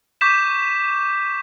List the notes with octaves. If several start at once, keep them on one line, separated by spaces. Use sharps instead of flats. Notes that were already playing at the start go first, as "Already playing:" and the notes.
C#6 D6 G6 B6 E7